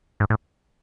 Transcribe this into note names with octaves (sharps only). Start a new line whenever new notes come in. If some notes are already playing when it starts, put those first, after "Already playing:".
G#2
A2